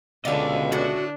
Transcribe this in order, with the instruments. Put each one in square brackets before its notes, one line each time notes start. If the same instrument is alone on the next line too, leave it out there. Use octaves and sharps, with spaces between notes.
[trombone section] C#2 B2 [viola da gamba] D3 [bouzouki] A4 D5 [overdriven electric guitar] D#5 F5
[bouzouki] A2 A3 [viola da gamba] D4 [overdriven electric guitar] F#4